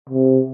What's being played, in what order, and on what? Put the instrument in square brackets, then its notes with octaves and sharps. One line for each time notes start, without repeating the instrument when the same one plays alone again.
[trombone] C3